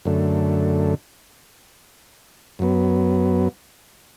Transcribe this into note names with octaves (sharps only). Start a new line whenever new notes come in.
F#2 D3 A3
F#2 F#3 B3